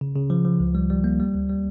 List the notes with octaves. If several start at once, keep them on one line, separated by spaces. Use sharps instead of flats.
C#3
C#3
F3
F3
C#2
G3
G3
A#3
G3
D2
G3